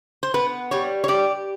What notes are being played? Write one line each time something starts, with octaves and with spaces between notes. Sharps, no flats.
C5
B3 B4
G3 C#5
C#5
G4 D5